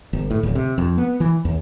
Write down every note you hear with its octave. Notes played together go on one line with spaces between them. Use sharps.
G1
A2
D1
C3
F2
B3
E3
D#2